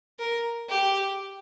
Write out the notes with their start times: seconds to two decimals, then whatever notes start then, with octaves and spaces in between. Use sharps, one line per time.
0.19 A#4
0.69 G4